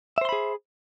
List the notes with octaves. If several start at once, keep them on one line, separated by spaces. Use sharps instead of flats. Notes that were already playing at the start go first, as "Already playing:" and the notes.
G#4 C5 E5 B5 C6